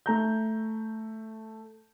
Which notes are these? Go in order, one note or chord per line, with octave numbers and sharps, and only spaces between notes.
A3 A#5 G6